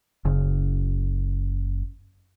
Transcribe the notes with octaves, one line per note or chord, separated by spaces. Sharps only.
F#1 C#3